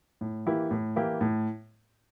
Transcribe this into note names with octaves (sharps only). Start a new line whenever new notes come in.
A2
E3 A#3 E4 G4
A2
E3 A#3 E4 G4
A2